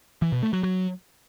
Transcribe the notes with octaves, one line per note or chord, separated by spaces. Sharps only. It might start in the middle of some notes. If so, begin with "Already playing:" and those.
E3
B2
A3
F#3
F#3